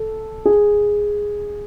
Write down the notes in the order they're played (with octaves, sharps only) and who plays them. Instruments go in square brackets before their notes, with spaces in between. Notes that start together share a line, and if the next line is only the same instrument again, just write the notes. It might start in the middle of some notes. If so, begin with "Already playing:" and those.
Already playing: [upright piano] A4
G#4